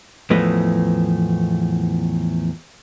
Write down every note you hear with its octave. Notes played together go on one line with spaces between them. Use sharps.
E2 A2 F3 A3 B4 D#5